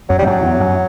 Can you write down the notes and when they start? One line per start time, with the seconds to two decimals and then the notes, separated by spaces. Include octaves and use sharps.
0.09 F#2 F#3
0.19 E2 G3
0.26 F#2 F#3
0.42 E2
0.60 F#2